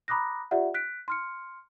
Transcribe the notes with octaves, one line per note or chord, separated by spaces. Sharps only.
A#5 B5 D6 D#6 F#6 A#6
F4 G4 D5 E5 F#5
F#6 B6 D7
C6 F6 C#7